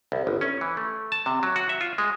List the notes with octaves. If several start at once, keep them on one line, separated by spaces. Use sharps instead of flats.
C2
G1
C#4
E3
A3
A5
C3
F#3
F#4
E5
F4
G#3